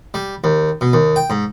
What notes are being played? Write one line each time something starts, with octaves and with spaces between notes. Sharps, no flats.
G3
D#2
B2
D#2
G5
G#2